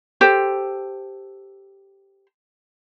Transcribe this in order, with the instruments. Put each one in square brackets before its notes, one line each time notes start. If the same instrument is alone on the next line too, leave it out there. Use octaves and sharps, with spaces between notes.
[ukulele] G4 A4 C5